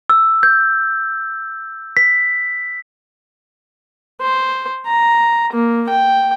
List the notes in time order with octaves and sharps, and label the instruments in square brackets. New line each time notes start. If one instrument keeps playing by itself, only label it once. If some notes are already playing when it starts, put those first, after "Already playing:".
[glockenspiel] E6
G6
B6
[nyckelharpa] C5
A#5
A#3
G5